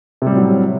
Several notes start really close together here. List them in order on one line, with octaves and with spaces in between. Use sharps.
C3 G3 A2 F#3